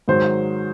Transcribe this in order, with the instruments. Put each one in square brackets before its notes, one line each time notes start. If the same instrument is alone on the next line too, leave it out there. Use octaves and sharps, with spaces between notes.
[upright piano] G#2 D#3 F#3 C5